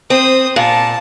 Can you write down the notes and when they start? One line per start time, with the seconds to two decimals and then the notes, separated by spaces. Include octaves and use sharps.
0.10 C4 C5 D#6
0.56 A#2 A5